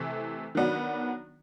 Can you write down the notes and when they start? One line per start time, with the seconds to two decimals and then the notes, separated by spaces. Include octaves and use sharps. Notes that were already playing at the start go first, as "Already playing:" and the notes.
Already playing: C3 E3 A3
0.55 D#3 F#3 B3 D4 F#4